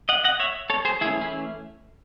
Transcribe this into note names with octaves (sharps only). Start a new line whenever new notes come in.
D#5 F#5
D#5 F#5
C#5 E5
A4 C#5
G#4 C5
E3 A3 C#4 E4 G#4
E4 G#4